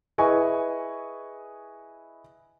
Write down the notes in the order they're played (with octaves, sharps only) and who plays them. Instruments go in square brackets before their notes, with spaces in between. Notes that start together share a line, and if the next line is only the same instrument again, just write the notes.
[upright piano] E4 G#4 B4 D#5 G#5 C#6